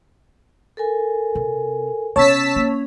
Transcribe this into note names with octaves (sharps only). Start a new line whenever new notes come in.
A4 A#4 G#5
C3
C3 B3 C#4 C#5 A5 E6 B6
A#3